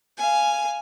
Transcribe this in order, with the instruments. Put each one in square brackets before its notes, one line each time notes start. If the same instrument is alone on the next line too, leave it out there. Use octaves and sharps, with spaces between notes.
[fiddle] F5 G#5